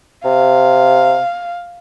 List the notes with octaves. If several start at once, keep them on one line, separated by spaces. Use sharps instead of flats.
C3 F5